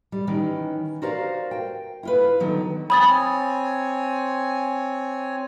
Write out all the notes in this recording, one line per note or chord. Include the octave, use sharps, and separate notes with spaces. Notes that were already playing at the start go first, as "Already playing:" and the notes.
G3
D#3 E3 C#4
F#4 G4 A#4 C5 D5 F5
G5
E4 F4 B4
D3 D#3 F#3 B3
C4 C#5 G#5 B5 D#6 A6